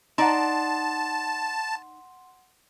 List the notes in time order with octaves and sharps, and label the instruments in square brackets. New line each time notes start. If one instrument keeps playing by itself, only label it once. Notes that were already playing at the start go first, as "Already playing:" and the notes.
[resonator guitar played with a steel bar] D#4 D5 [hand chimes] F#5 C6 [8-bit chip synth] A5